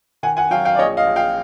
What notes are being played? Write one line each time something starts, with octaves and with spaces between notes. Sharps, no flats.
D#3 F#5 G#5
F#5 G#5
F#3 F5 G5
F5 G5
D5
A#1 C#5 D#5
D#5 F5
A#1
F5 G5